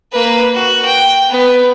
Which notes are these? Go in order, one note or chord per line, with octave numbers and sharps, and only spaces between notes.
A#3 B4
F#4
G5
B3